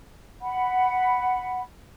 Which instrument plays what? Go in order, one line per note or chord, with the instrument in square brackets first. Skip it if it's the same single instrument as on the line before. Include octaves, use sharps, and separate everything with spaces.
[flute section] F#5 B5